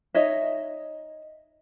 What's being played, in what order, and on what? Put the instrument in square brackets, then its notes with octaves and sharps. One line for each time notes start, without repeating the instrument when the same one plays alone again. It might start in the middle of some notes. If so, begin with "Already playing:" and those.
[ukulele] D#4 C#5 D#5 E5